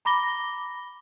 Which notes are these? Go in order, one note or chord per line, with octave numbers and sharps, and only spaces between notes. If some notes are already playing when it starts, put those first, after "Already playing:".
A#5 B5 D6 A#6 G7